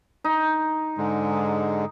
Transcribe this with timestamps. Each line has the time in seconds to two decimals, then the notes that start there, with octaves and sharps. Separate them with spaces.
0.24 D#4
0.98 G#2 D3 G#3